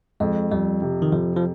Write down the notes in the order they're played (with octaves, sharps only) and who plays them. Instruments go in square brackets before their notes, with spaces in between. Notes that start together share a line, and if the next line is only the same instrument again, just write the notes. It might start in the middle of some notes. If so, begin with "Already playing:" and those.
[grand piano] F2 [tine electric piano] G#3
[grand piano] F2 [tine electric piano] G3
[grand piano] C3
[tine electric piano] D#3
[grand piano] F2 [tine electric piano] F3
[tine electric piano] F3